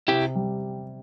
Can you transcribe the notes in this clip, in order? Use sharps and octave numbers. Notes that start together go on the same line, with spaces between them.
C3 E4 G4
G3